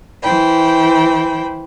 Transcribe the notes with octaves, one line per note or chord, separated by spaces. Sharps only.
E3 C5 G5 B5